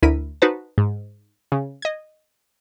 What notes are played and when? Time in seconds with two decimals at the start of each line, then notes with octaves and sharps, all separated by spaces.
0.02 D2 E4 A#4 B6 D#7
0.42 D#4 F#4 B4 C5 A5
0.78 G#2
1.52 C#3
1.82 D#5 G#6